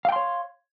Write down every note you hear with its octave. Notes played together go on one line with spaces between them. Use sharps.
C#5 F5 G5 C6